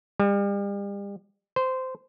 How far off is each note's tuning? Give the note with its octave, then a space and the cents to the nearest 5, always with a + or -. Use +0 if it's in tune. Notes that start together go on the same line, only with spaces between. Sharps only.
G3 +40
C5 -15